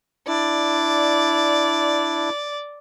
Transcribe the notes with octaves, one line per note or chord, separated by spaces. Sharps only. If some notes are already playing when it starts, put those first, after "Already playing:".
D4 E4 D5